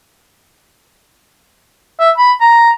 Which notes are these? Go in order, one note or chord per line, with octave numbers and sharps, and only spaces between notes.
E5
B5
A#5